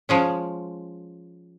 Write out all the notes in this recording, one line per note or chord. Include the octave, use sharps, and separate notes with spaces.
F3 G#3 C#4